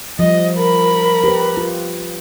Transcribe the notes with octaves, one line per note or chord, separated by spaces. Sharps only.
F3 G3 D#5
A#4 B5
G4 B4
F4